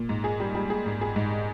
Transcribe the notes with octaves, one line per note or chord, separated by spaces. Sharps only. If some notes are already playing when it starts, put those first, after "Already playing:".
Already playing: A#2
G#2
G#4
G3
G3
G#4
G#2
G#4
G#2